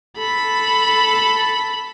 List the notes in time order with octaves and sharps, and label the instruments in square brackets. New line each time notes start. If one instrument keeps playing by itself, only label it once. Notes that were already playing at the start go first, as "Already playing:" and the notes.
[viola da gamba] A4 [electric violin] B5